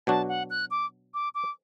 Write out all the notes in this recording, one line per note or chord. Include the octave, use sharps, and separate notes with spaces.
B2 F#3 D4 F#4 A5
F#5
F#6
D6
D6
D6